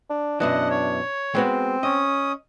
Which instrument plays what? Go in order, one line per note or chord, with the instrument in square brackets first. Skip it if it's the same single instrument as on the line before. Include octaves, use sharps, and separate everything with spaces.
[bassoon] D4
[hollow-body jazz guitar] F#2 B2 E3 [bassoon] D4 [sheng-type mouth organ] D#5 F#5
[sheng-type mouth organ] C#5
[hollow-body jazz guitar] G#3 B3 F#4 [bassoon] C4
[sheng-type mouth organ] C#4 D#6 [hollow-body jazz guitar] D#5